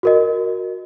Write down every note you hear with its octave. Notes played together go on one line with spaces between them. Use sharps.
F#4 A#4 D#5